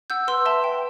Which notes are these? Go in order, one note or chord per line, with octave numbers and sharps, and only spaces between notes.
F#5 E6 G6
B4 C6 E6
E5 A5 C6
G5